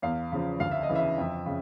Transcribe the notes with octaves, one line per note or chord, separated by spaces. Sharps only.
E2 F5
C#3 F3
D2 F5
E5
D#5
C#3 E3
E5
F2
C#3